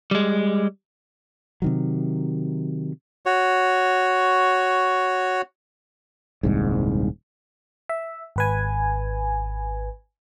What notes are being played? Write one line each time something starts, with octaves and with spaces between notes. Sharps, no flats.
G3 G#3
C3 D#3 F#3
F#4 C#5
D#1 C2 G#2
E5
G#1 B4 G#5